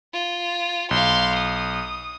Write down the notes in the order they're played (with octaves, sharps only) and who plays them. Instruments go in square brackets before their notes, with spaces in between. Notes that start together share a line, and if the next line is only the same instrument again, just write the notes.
[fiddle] F4
[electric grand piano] B1 [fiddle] F5 C6
[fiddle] D#6